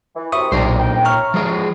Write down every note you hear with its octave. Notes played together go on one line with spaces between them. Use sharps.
E3
F#2 C3 E3 E5 C#6 D#6
B1 A#2 D4 D#4 G4 C5
G5
C#5 E5 A#5 C#6 F6
E2 F3 G#3 G#4